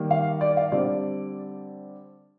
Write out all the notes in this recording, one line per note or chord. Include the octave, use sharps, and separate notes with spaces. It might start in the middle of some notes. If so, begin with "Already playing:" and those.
Already playing: D#3 G3 A#3
F5
D5
F5
D3 G3 C4 D5